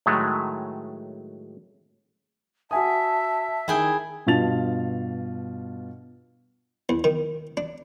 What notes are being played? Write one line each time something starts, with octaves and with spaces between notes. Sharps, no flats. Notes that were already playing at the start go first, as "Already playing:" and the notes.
A2 D#3 F#3 G#3 A3
F#4 E5 G#5 A5 D#6
D#3 E4 G#4 G5
G2 B2 F4 A5 A6 F7
E2
D#3
D4